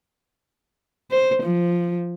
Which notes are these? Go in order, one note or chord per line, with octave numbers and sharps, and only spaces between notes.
C5
F3